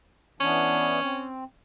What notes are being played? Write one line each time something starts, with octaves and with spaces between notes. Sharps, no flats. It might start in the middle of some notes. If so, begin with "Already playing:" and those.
E3 B3 C#4 D4
C4